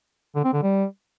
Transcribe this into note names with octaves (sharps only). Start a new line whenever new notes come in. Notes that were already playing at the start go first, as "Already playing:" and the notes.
D3
C4
D3
G3